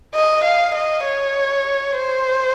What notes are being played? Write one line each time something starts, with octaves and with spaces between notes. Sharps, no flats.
D#5
F5
D#5
C#5
C5